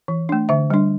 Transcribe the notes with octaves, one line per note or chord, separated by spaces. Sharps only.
E3
A3 D4
D3 E5
G3 D4